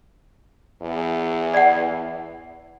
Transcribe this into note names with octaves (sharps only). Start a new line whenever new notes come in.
E2
D5 F#5